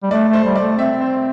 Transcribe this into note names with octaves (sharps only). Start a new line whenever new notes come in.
G3
A3 D5
A3
C5
G3
D5
A3
C4 E5
C5